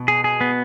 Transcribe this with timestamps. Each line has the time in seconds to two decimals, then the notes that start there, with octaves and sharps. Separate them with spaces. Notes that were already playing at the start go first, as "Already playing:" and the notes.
Already playing: B2
0.08 G#4
0.24 G#4
0.41 B3